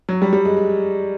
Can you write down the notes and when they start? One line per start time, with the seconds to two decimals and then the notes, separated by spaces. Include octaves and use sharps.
0.09 F#3
0.22 G3
0.33 G3
0.45 G#3
0.57 G#3